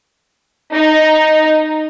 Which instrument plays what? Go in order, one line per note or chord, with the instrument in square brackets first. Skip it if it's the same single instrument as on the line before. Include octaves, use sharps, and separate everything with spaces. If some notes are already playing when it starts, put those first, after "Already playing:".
[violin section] D#4